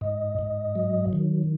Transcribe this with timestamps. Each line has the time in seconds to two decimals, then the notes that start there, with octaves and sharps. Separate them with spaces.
0.01 G#2 D#5
0.39 G#2
0.75 F#3
1.13 D#3